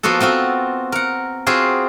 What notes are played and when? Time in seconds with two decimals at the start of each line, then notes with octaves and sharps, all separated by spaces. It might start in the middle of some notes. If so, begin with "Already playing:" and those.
0.03 F3 A#3 B3 F#4 A4
0.20 B3 C4 F4 F#4
0.92 A#4 F#5
1.47 C4 F4 F#4 G#4